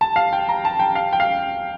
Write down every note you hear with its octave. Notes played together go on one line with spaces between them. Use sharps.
A5
F5
G5
A#5
A5
G5
F5
G5
F5